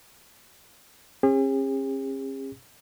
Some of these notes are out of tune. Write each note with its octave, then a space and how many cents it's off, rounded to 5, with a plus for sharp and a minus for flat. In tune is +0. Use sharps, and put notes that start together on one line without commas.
C#4 -45 G#4 -45